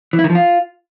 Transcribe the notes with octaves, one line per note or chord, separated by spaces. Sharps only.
E3
E4
D#3
F3
F4